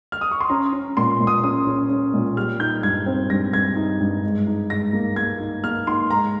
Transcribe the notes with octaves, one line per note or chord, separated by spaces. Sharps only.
F6
D#6
C#6
C6
C#4 A#5
C#4
A#2 C6
A#2
D#6
C#4 D#6
C#4
C#4
A#2
G3 F6
D#4 G6
G2 G#6
C4
G2 A#6
G2 G#6
D#4
G2
G#2
D#4
G#2 A#6
A#3
A#3 G#6
D#4
A#3 F6
D#4 C6
G#2 A#5